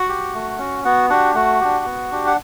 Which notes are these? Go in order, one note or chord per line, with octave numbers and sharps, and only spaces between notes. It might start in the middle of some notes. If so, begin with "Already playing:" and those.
Already playing: F#4 F#5
G4
A3
C#4 F#4
B3 F#4 F#5
D4 F#4 G4 F#5
A3 F#4 F#5
D4 G4
B3
D4 G4
F#5